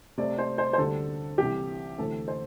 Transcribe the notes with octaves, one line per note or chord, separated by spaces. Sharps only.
C3 A3 C4 D5
C5
C5
C5
D2 D3 G3 D4 A4
C2 C3 E3 G4
D2 C3 E3 A3 C4 A4
C5